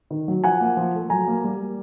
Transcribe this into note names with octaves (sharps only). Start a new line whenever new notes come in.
D#3
F#3
F3 F#5 G#5
A#3
F3
A3
F#3 G#5 A#5
A#3
G3